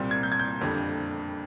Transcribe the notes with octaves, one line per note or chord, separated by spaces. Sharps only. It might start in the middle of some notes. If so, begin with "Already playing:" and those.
Already playing: C2 A#2 G3 C4
G#6
G6
G#6
G6
F#1 F2 D3 G3